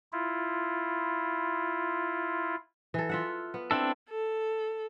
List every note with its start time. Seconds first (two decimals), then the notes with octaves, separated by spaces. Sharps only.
0.12 E4 F4
2.94 E3 A4
3.09 F4 E5 F#5
3.54 B3
3.71 C4 D4 E4 A4
4.09 A4